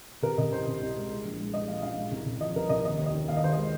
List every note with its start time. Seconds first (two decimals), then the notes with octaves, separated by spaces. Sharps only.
0.22 C3 A#4
0.38 C3 D#5
0.52 C2 C5
0.67 C3
0.81 C2
0.96 G#3
1.11 G#3
1.25 A#1
1.39 G#3
1.53 G#3 D#5
1.68 A#1 F5
1.82 A#1 F5
1.97 G#3
2.12 C2
2.26 C2
2.40 F3 D#5
2.56 C2 A#4
2.69 C2 D#5
2.84 D#2 D#5
2.99 D#2
3.06 D#5
3.14 D#3
3.28 D#2 F5
3.37 D#5
3.43 D#3 C5
3.53 G#3 D#5